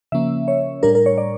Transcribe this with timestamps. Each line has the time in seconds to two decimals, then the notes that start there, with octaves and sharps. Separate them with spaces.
0.12 C#3 F3 A#3 C#4 E5
0.48 C#5
0.83 A2 G3 D4 A#4
0.95 A#4
1.06 C#5
1.18 D5